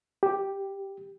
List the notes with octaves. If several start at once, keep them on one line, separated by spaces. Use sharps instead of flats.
G4